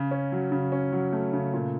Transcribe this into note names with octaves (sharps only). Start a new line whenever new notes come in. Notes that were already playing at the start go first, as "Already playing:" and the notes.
Already playing: C#3
C#4
F#3
C#3
C#4
F#3
A3
C#3
A#2